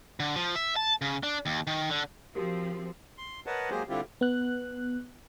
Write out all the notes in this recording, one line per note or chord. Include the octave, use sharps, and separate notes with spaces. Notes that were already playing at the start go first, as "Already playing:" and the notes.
D3
F3
E5
A5
C#3
D4
D#2
D#3
D3
F3 C4 F#4 G4 A#4
C6
A#4 B4 C#5 D#5 F#5 A5
F#3 G#3 A#3 G4 G#4 C5
D3 G3 C4 E4 F4 G4
B3 F#6